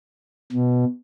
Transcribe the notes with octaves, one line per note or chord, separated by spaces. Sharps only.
B2